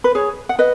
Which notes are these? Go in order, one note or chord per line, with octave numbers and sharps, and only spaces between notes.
B4
G#4 C#5
F#5
B4 D#5